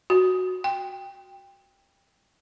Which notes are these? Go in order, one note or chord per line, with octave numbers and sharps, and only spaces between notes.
F#4
G5